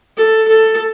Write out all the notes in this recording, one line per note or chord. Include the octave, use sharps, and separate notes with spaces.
A4
A4